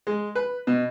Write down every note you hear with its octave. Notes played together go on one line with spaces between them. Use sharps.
G#3
B4
B2